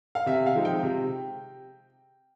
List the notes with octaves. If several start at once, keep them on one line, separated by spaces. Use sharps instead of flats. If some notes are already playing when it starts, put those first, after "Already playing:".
F5
C3 E5
F5
F3 G#3 C4 D#4
G5
C3